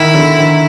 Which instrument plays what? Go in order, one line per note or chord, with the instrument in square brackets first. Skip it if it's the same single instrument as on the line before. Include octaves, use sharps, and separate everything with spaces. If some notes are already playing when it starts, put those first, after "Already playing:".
Already playing: [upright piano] D#3 [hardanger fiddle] E4
[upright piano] D3
D#3